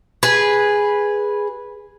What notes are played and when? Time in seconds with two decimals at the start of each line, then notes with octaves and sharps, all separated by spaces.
0.23 G#4 B4